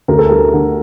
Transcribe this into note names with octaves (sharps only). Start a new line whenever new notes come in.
D2 A#4
A4
G3 A#4
D3